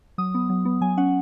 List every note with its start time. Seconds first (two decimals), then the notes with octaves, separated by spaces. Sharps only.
0.18 F#3 D#6
0.34 B3
0.49 F#3
0.65 B3
0.81 F#3 G#5
0.98 C#4 F#5